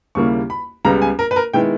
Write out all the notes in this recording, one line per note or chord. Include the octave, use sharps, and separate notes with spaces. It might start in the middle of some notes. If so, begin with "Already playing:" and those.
D#2 C#3 G3 A#3 E4 C#6
B5
C#2 C#3 G3 B3 A#5
G#5
A#4
B4
A#4
D#3 G#3 B3 E4 G5